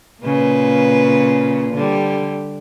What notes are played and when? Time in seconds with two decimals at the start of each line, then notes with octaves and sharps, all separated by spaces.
0.23 A#2 C#3 B4
1.74 D3 G3